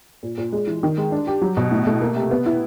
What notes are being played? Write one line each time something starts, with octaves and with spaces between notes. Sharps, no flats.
A#2
A#2
G#3
E3
D#3
G#3
D4
G4
F#3
B2
A2
A3
A#3
C3
B3
E4